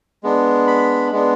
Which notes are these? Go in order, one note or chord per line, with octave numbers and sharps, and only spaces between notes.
G#3 B3 D4
B5
G#3 B3 D4